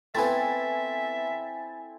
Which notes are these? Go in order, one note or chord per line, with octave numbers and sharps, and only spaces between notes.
A3 B3 C4 E4 A4 E5 G#5 A6